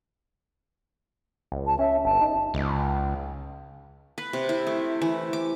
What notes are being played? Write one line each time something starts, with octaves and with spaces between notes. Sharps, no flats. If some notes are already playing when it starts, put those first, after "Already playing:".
C#2
A5
C#4 E5
G1 A5
D#4
C#2
B4
C3
E4
A3
E3
D6